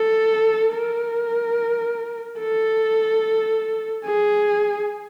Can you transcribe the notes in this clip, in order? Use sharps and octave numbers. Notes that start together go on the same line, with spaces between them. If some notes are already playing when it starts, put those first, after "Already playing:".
Already playing: A4
A#4
A4
G#4